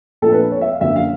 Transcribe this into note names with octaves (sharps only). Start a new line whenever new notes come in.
A#2 F3 A3 D4 A4
B4
C#5
E5
F5
F#2 D3 F#3 A#3 E5
F5